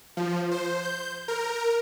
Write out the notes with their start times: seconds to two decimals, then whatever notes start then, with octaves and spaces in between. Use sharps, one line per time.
0.17 F3
0.51 C5
0.82 G6
1.28 A#4